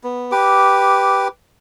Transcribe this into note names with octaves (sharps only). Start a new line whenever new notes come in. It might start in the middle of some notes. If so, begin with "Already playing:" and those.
B3
G4 B4 D6